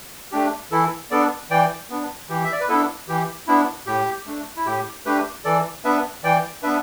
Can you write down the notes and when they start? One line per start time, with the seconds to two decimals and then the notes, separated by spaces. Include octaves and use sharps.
0.32 A3 D4 G4
0.71 E3 E4 A4
1.11 B3 D4 A4 D5
1.50 E3 D5 G5
1.90 B3 D4
2.29 E3 G4
2.44 E5
2.52 D5
2.60 B4
2.69 B3 D4 E4 A4
3.08 E3 G4
3.47 B3 D4 E4
3.87 A2 G4
4.26 A3 D4
4.56 E4
4.66 A2 G4
5.05 A3 D4 G4 B4
5.45 E3 A4 D5
5.84 B3 D4 B4 E5
6.24 E3 D5 G5
6.63 B3 D4 B4 E5